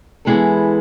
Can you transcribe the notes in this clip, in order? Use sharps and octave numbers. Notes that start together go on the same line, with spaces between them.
E3 G#3 B3 E4 A4